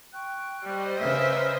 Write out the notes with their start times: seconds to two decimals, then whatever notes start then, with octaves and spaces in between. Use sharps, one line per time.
0.14 G5 C#6 F#6
0.63 G3 C5 D#5
1.00 C#3 A#4 B4 E5 F6